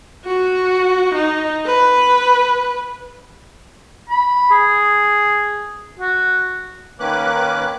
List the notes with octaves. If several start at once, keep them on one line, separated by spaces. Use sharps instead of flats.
F#4
D#4
B4
B5
G#4
F#4
D#3 A#3 C#4 B4 D6 F#6